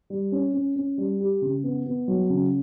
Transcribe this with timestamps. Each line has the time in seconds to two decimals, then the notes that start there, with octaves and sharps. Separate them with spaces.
0.10 G3
0.32 C#4
0.54 C#4
0.76 C#4
0.98 G3
1.20 G4
1.42 C#3
1.64 B3
1.86 B3
2.08 F#3
2.30 C#3